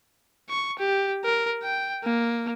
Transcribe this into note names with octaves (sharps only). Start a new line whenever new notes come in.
C#6
G4
A#4
G5
A#3